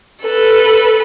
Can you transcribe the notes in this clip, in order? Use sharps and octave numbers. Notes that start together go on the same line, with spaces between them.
A4 B4